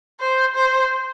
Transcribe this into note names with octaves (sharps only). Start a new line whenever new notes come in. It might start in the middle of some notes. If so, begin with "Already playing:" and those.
C5
C5